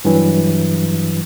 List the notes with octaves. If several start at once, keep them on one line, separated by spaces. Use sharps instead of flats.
G2 E3 F#3